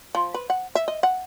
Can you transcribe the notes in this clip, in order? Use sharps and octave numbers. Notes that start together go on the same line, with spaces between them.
F3
B4
F#5
E5
D#5
F#5